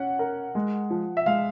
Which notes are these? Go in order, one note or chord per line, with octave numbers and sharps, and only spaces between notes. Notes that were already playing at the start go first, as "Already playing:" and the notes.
Already playing: C#4 F#5
A#4
G#3
F3
E5
G#3 F5